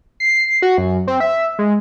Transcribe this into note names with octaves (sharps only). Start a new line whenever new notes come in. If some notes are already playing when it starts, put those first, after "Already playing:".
C7
F#4
F#2
C4
E5
G#3